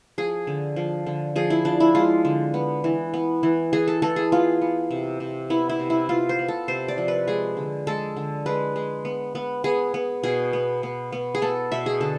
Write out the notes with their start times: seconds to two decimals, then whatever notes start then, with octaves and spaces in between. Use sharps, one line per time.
0.18 F3 G#4
0.47 D3
0.76 F3
1.07 D3
1.36 F3 G#4
1.50 E4
1.65 F3 D4
1.80 E4
1.95 G#3 F4
2.25 D3
2.54 B3
2.84 E3
3.14 B3
3.43 E3
3.73 E3 G#4
3.88 A4
4.02 E3 A4
4.16 G#4
4.32 B3 F4
4.61 B3
4.91 C3
5.20 C3
5.50 B3 E4
5.69 E4
5.79 C3
5.90 E4
6.09 B3 F4
6.29 C5
6.39 B3
6.48 A4
6.68 C3 C5
6.88 D5
6.98 F3
7.08 B4
7.27 G#3 G#4
7.57 D3
7.87 G#3 A4
8.17 D3
8.46 G#3 B4
8.76 G#3
9.05 B3
9.35 B3
9.64 B3 G#4
9.94 B3
10.23 B2 G#4
10.53 B3
10.83 B3
11.12 B3
11.35 G#4
11.42 B3 A4
11.72 B2 E5
11.86 G#4
12.01 D3 A4